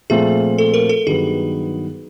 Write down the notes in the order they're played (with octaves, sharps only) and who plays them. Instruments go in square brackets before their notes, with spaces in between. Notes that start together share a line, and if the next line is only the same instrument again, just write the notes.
[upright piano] A#2 F3 A3 C4 F4 [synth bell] G#4
[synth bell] A4
A#4
A4
[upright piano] G2 D#3 F#3 B3 [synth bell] G#4